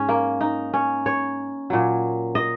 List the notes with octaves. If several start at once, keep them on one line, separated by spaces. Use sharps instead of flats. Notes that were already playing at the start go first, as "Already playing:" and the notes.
Already playing: G#2 C#4
A#3
D#4
C#4
C#5
A#2 F#3
D#5